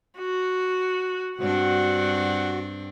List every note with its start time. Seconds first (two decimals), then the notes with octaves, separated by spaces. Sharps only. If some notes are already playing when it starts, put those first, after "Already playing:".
0.19 F#4
1.40 G2 C4 D4 F#4 F#5